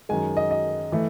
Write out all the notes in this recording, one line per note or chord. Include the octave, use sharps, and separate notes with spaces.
F#2 D#3 G#3 G#5
D#5
D#5
E3 A3